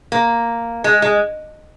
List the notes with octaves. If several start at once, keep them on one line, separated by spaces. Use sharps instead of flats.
A#3
G#3
G#3